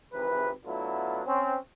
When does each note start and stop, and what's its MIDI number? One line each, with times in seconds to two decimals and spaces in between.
0.13 0.50 32
0.13 0.50 48
0.13 0.50 52
0.13 0.50 68
0.13 0.50 71
0.65 1.21 54
0.65 1.21 57
0.65 1.21 59
0.65 1.21 62
0.65 1.21 64
0.65 1.21 65
1.25 1.56 60
1.25 1.56 61